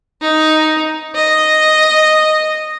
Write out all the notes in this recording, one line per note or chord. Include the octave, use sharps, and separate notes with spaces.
D#4
D#5